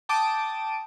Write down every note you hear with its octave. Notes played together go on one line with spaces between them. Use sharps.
G5 A5 D6 D#6